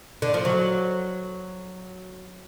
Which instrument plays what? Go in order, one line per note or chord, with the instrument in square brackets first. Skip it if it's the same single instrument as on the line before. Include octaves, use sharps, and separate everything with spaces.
[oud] D3
F3
F#3